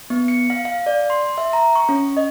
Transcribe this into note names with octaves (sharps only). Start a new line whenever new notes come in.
B3
C#7
F5
F5
D5
C6
E5
A#5
C#6
C#4
D#5